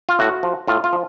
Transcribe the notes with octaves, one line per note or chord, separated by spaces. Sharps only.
F4
A2 F#4
F3
A2 F4
F4
F3